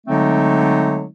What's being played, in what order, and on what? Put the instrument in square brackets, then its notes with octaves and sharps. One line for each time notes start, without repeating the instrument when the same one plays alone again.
[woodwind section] D3 F#3 G#3 A3 C4 D#4